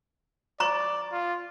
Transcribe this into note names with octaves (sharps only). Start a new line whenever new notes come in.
D5 A#5 C#6
F4